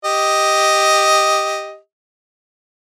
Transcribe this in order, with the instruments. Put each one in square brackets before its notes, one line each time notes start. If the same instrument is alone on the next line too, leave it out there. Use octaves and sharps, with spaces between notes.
[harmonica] G4 D#5